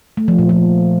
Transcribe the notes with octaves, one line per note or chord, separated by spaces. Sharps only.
A3
F3
A#2
F3